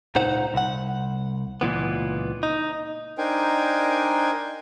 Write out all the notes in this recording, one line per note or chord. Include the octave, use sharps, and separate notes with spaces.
C#2 A#2 D#4 C5 F#5
C2 F#5
C#2 A#2 E3 B3
D#4
D4 D#4 A#4 C5 G5 G#5